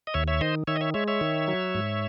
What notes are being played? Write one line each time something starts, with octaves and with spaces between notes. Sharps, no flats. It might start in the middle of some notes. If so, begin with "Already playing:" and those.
D#5
D#2 C#5 E5
C#5 E5
D#3 C5 D#5
D#3 C#5 E5
D#5
C#5 E5
G#3 C#5 E5
C#5 E5
D#3
F#3
G#2